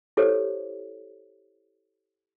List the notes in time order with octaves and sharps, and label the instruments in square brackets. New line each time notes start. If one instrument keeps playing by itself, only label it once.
[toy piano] E4 G4 A4 C5 C#5